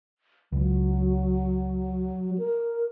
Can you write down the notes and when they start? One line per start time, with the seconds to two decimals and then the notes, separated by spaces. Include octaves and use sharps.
0.52 C#2 F#3
2.38 A#4